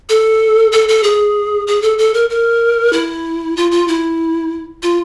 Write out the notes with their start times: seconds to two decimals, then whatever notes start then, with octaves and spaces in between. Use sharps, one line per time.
0.09 A4
0.72 A4
0.88 A4
1.03 G#4
1.67 G#4
1.82 A4
1.98 A4
2.14 A#4
2.30 A#4
2.93 E4
3.56 F4
3.71 F4
3.88 E4
4.83 F4